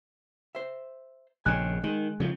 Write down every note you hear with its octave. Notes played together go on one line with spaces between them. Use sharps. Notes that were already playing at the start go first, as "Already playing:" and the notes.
C5 E5
A#1 C#3 G4 D#5 G#5 F#6
D#3 G#3
C#3 F3